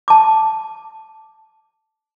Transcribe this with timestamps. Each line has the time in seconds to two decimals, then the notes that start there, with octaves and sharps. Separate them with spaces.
0.08 A5 D6